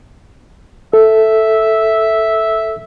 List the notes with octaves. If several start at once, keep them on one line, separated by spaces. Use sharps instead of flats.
A4 E5